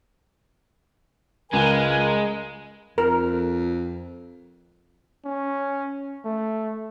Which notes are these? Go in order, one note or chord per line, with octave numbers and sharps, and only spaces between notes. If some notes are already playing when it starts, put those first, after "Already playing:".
C#2 G#3 F4 A#4 B4 G#5
F2 A#4
C#4
A3